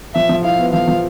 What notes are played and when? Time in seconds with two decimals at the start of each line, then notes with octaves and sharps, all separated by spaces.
0.14 F3 E5
0.29 F3
0.44 E4 F5
0.58 B3
0.73 F3 F5
0.88 F3